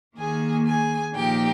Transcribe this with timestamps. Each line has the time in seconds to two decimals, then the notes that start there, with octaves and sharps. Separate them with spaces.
0.17 D#2 D#3 A#3 G#4 G#5
0.65 G#4 G#5
1.15 A#2 F3 A#3 D#4 G4 G5